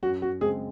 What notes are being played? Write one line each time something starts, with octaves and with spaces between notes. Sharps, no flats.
F#2 F#4
F#4
C#3 G#3 C4 G#4